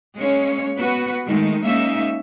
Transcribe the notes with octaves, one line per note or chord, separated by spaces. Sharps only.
G#3 A#3 C#4 C#5
B3 F#4 B4
D#3 G#3 A3 D#4
G#3 A#3 C#4 D#4 E5